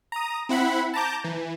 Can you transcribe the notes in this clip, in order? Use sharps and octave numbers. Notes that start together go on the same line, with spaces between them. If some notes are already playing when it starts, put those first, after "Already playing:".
A#5 D#6
C4 E4 F#5 B5
A5 A#5 D6 G6
E3